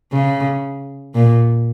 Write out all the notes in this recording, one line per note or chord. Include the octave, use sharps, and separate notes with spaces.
C#3
A#2